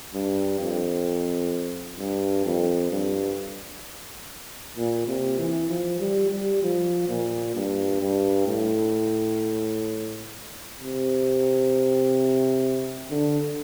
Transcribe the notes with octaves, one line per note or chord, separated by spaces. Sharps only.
G2
F2
G2
F2
G2
A#2
C3
E3
F3
G3
G3
F3
A#2
G2
G2
A2
C3
D3